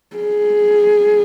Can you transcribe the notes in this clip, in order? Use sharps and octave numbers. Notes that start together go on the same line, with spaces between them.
G#4